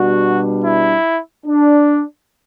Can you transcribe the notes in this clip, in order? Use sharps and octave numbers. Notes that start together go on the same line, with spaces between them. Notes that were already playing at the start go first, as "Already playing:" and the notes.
Already playing: B2 G3 D4 F#4
E4
D4